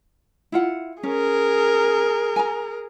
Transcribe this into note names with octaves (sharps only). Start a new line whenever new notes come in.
E4 F4 F#5
C#4 G#4 A#4
G#5 A#5